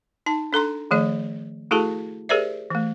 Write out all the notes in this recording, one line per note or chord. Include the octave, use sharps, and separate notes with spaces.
D#4 A5
D4 A4 A#5 C6
D#3 F3 A3 G#4 D#5
A3 E4 F#4 G#4 A4 A5
G4 G#4 A#4 C5 D5 E5
E3 A3